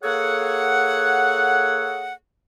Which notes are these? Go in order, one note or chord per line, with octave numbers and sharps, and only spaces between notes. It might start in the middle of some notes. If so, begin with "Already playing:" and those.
A#3 G#4 A4 C#5 F#5